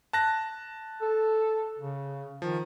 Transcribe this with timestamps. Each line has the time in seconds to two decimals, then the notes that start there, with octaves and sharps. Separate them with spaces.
0.13 A5 F#6 A#6
1.01 A4
1.79 C#3
2.42 D#3 F3